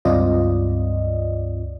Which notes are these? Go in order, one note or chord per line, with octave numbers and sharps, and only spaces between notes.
C#2 G2 C4 F4 D5 D#5